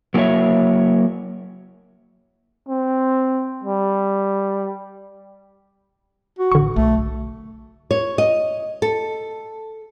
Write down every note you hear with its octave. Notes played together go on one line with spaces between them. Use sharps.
F#3 A#3 E4 F4 C#5 E5
C4
G3
F#4
A1 D3 C#6
B1 A3
G#1
C#5
D#5
A4